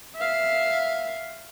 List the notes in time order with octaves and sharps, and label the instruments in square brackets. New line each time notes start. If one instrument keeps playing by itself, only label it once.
[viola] E5 F5